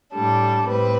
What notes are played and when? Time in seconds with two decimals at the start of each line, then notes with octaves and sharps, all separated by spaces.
0.13 A2 G3 D4 A4
0.67 A2 G3 C4 B4